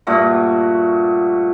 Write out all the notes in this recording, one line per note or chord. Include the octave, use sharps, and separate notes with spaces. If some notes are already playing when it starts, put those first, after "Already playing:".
G2 A#2 A3 F#4